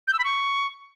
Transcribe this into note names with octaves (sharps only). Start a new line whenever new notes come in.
G6
E6
B5
C#6